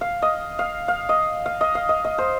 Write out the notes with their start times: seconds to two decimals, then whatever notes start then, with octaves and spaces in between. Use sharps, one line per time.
0.01 F5
0.22 D#5
0.59 F5
0.88 F5
1.09 D#5
1.46 F5
1.61 D#5
1.75 F5
1.89 D#5
2.05 D#5
2.18 C5